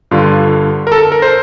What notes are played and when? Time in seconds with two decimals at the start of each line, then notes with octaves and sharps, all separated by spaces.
0.11 G2 D3 F4
0.87 A#4
0.92 A4
1.12 A#4
1.22 C5